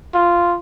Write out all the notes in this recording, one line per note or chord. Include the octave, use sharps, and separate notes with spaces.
F4